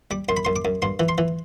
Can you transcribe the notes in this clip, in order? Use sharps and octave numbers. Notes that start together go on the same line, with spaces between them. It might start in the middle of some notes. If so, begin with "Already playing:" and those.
G3 D6
F#2 C6
B5
F#2 C6
D6
F#2
G2 C6
E3
C6
E3